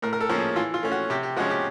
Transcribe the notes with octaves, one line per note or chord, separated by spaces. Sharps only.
A2 A#4
A#4
A4
F3 A#3 C#4
G#4
E3 F4
F4
A3 C#4
F#4
C3 G4
G4
F3 G#3 C#4 F#4
G4